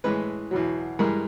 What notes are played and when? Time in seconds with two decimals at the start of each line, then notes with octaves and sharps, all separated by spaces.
0.04 A2 E3 G#3 B4
0.51 E2 B2 F#3
0.99 G2 E3 G#3 A#4